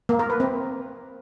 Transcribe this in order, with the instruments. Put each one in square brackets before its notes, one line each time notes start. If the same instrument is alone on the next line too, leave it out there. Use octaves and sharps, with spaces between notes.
[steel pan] A#3
A#4
B4
C4